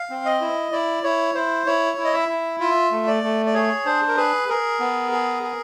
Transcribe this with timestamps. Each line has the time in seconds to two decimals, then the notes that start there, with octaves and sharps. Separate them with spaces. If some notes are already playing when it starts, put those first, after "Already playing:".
Already playing: F5
0.10 C4
0.25 D#5
0.41 E4
0.72 E4 D5
1.03 E4 C#5
1.35 E4 C5
1.66 E4 C#5
1.97 E4
2.05 D#5
2.13 E5
2.29 E4
2.60 F4 E5
2.91 A3
3.07 D5
3.23 A3
3.46 D5
3.54 G#4 C#5
3.86 D4 C5
4.08 A#4
4.16 G#4 B4
4.49 G#4 A#4
4.80 B3
5.12 G#4
5.43 G#4